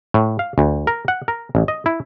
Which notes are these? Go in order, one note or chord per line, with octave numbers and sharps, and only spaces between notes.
A2
F5
D2
A#4
F#5
A#4
A1
D#5
E4